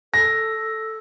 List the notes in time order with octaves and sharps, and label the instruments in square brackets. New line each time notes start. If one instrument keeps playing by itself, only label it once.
[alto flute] A4 [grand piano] A#6